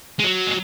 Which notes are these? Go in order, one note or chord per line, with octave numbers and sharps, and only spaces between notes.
G#3
F#3
G#3